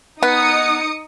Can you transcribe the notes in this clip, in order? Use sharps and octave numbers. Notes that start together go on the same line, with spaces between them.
B3 D#4 D#6 C#7